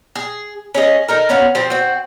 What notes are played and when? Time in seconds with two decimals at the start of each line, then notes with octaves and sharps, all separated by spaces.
0.15 G#4
0.75 C#4 G#4 D#5
1.08 D#4 A4 A#4
1.29 B3 C#4 F5 F#5
1.55 F3 C4
1.70 C4 F#4